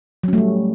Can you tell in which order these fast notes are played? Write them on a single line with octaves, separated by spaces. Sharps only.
F#3 C#4 A3 G3